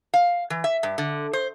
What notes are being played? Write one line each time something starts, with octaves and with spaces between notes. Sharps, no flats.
F5
E3
E5
G2
D3
C5